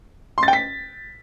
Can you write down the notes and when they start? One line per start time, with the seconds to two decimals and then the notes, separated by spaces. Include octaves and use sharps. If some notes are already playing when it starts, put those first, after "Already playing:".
0.38 C6
0.43 A6
0.48 G5
0.53 B6